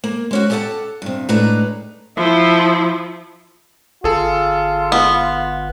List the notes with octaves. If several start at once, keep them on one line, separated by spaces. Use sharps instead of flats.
A#3
G#3 C#4 F#4
G4 A4 D#5 E5 F#5 A5
G2 C3
A2 G#3 D4 D#4 B4 A#5
F3 E4
G1 F4 G#4 A4
B3